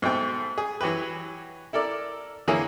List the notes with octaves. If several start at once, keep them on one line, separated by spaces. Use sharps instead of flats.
G#2 B2 A3 G5 C#6
G#4
E3 F#3 F#4 G4 B4
E4 A4 A#4 D5
D3 E3 A#3 E4 G#4 C#5